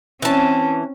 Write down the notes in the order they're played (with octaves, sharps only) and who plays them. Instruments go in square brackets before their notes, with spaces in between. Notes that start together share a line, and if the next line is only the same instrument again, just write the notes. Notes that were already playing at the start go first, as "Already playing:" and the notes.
[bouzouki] E3 A5 [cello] C4 C#4